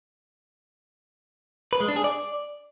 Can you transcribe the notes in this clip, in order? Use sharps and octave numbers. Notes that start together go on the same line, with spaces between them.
B4
G#3
D4
G#4
D5